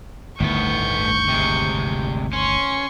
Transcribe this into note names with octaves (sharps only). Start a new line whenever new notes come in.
G1 D2 A2 D#3 B3 C#6 G6
C3 G#3
C#4 C6 C#6